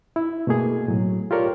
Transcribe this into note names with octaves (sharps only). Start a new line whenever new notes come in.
E4
B2 A3 A#3 G#4
A2 F#3
F4 G4 A4 A#4 C#5 D5